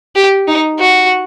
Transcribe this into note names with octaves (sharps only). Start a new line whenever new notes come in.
G4
D#4
F#4